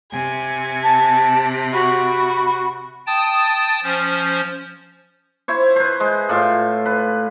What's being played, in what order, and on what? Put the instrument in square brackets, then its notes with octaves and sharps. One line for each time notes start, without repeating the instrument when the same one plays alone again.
[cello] C3 [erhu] G#5
[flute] A5
[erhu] F#4 [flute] B5
[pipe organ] G5 A5 D#6 A6
F3 C#4 C5
[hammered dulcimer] E4 C5 C#5
B4 C5
G#3
A2 F4 E5
B4